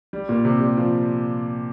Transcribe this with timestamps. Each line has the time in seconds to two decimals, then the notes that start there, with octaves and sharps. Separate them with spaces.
0.13 G3
0.29 A#2
0.45 C3
0.61 G3
0.77 F3